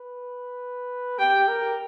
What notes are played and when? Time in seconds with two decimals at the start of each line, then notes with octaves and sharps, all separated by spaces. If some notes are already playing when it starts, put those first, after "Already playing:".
Already playing: B4
1.19 G4 G5
1.48 A#4